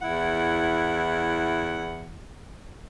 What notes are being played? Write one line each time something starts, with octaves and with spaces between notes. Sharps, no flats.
E2 E4 F#5